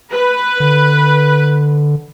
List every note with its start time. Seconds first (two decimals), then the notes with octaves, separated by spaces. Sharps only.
0.12 B4
0.60 D3